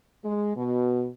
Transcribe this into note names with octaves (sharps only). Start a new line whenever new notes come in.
G#3
B2